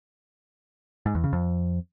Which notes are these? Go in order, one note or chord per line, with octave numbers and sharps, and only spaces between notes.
G#2
E2
C#3
F2